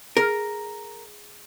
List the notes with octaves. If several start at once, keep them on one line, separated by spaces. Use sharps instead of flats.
G#4 A#4 F6